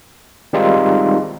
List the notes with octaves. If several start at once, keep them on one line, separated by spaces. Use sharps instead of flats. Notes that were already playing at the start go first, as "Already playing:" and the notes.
D#3 G3 G#3 C4 D#4 F4